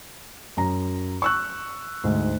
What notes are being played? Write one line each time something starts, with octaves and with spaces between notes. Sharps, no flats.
F#2 A#5
C#6 E6 F#6
D2 G#2